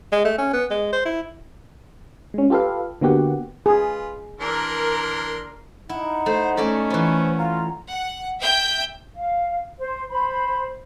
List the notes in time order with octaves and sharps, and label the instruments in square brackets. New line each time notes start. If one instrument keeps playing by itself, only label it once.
[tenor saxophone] G#3
A3
C#4
B3
G#3
C5
E4
[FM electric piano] G#3 C#4
F4 G4 A4 B4 F5
D3 A#3 B3 F#4 G4 F#5
[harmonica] F4 B4 [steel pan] G#4
[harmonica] E3 D4 C6 [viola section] A#4
[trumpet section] D#4 [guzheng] E4 [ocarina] F#5
[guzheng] A3 [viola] C5
[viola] A3 C#4 [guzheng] A4 D5 E5
[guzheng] E3 B3 [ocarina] C5
[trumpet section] F4 [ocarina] A#5
[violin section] F#5
E5 G5 G6
[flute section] F5
C5
C5 B5